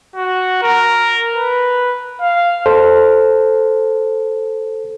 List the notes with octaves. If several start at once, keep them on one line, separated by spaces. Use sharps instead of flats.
F#4
A#4
B4
F5
A4 C5